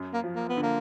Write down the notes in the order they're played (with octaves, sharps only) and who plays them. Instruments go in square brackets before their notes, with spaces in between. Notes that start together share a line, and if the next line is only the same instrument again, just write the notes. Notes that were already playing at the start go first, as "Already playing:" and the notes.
Already playing: [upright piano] F#2
[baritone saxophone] A#3
[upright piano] F3
[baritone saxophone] A#3
B3
[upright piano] D3
[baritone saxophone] A#3